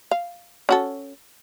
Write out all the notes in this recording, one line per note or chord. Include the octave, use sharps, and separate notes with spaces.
F5
C#4 F#4 A4